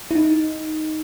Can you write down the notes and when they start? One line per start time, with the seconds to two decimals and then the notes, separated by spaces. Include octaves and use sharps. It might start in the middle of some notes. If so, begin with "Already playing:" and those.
0.11 E4
0.15 D#4